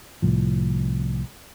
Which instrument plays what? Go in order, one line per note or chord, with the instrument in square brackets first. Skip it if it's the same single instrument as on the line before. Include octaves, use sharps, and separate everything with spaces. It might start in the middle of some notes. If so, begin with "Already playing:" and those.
[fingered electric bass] C2 A2 F3